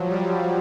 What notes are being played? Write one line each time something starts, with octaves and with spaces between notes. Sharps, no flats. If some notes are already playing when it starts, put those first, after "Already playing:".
Already playing: F3 F#3
G3